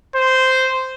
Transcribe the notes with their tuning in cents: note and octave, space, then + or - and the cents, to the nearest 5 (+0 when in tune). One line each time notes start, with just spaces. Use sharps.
C5 -10